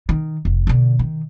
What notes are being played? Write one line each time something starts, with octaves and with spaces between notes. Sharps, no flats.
D#3
F1
B2 D3
D#3